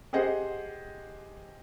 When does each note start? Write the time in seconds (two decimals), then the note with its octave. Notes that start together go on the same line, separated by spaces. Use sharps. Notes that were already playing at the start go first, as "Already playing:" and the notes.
0.13 G4 G#4 C5 D#5 F#5